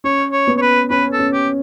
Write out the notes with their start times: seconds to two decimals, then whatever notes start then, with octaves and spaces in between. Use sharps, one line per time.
0.04 C#4 C#5
0.32 C#5
0.47 B3
0.58 C#5
0.62 B4
0.90 C#4 B4
1.13 A4
1.19 C#4
1.33 G4